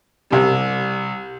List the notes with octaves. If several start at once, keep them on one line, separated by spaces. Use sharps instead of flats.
C2 G3